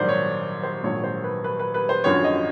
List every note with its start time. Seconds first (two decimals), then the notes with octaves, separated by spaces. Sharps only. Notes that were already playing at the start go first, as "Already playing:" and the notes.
Already playing: A#1 G#2 D#3 F#3 C5 D5
0.09 C#5
0.63 C5
0.83 A#1 G#2 D#3 F#3 C#5
1.04 C5
1.24 B4
1.44 B4
1.59 B4
1.74 B4
1.89 C5
2.04 G#1 F#2 D3 F3 C#5
2.24 D#5